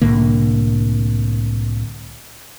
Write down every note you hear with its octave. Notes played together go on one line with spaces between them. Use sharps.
C2 A2 D3 A#3